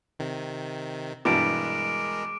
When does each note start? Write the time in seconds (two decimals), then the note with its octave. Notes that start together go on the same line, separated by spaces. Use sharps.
0.19 C3 D#3
1.25 G2 B2 E3 G#3 A#4 D6 D7